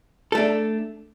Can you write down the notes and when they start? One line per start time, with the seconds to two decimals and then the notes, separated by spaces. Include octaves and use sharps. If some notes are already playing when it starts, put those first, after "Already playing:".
0.32 A4
0.35 A3
0.38 D4